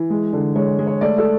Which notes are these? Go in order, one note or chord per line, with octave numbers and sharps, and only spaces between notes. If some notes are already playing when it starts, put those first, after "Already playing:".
Already playing: E3
G#3
D3
G#3 C#5
G#3
C#5
A3 D5
A4